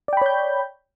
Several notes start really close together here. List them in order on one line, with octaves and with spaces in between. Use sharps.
D5 G5 B5 C#5 G6